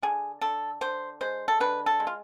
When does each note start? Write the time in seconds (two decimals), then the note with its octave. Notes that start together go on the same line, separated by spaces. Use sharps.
0.02 D3 G#4
0.41 D3 A4
0.81 D3 C5
1.21 G#3 C5
1.48 A4
1.60 D3 B4
1.86 A4
2.00 G#3
2.07 F4